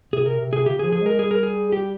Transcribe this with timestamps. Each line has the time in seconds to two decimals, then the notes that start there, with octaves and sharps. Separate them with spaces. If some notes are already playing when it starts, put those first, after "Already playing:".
0.13 C3 G#4
0.26 C3 A#4
0.40 C3
0.53 C3 G#4
0.66 C#3 G4
0.79 G#4
0.84 F3
0.92 G#4
1.02 G#3 A#4
1.19 G3 G#4
1.31 A#4
1.43 G#4
1.72 G4